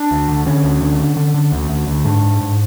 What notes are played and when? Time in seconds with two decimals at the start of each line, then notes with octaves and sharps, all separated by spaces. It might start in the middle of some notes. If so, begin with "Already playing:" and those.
Already playing: D4
0.11 D2
0.28 D3
0.46 D3 C#4
0.64 D2
0.81 D3
1.00 D3
1.17 D3
1.34 D3
1.52 D2
1.69 D2
1.87 D2
2.05 G#2 D4
2.23 G#2
2.41 G#2